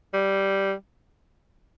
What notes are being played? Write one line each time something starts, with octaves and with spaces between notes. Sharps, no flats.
G3